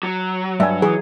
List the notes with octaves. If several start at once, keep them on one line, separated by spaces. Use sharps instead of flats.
F#3
G2 E5 G#5
E3 G#4